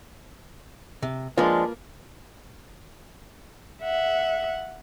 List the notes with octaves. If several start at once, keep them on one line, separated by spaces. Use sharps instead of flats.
C3
F3 G#3 A#3 D4 F4 A#4 B4
E5 F#5